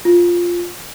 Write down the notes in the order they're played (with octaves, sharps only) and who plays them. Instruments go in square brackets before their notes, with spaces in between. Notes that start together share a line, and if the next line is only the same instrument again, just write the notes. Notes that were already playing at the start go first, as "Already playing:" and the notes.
[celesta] F4